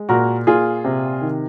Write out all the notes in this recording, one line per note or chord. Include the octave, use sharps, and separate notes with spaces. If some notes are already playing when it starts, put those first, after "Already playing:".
Already playing: G#3
A#2 F#4 A#4
A#2 F4 G#4
C3
D#3